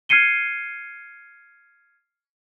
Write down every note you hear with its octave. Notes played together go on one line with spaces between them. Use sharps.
F6 G#6 C7 C#7 D#7 G7